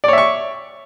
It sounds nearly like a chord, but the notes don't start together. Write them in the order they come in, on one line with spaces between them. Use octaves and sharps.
D5 C#5 E5 C#6